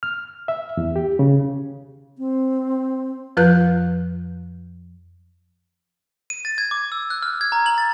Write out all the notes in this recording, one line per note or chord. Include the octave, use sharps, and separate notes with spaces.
F6
E5
E2
G4
C#3
C4
F2 F3 F4 B4 F#6 G6
D#7
A6
G#6
D6
E6
F#6
F6
G#6
A#5
F#7
A6